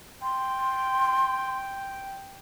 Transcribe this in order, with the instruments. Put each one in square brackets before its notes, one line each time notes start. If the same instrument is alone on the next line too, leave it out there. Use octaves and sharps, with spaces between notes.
[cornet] G5 [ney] C6